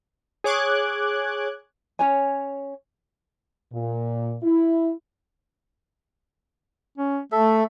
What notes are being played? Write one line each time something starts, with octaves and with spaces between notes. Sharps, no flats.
G#4 C#5 D6 F#6 G#6
C#4 C#5 G#5
A#2
E4
C#4
A3 A4 E5